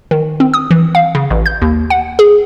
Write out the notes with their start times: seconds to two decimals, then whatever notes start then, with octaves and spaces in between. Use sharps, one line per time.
0.11 D#3
0.40 C4
0.54 D#6
0.71 E3
0.95 F5
1.15 C#3
1.30 A1
1.46 G6
1.62 D#2
1.90 F#5
2.19 G#4